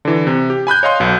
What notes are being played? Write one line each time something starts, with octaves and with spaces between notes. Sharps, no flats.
D3 E3
C3
G4
G#5 B5 F#6 G6
C#5 D#5 F5 C6
B1 B2